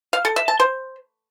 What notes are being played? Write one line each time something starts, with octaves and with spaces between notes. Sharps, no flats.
F5
A4
E5
A5
C5